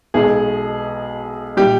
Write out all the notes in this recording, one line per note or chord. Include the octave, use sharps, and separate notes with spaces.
B1 B2 G#3 G#4
A#2 G3 G4